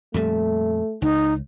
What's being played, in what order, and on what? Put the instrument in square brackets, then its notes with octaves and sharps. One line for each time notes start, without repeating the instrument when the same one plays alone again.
[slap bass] F2 A#2 G3 [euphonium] A3
[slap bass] C#2 [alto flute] D#4